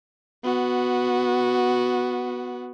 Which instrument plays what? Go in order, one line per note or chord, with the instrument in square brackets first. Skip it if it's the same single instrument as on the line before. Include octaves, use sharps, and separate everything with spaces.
[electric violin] B3 F#4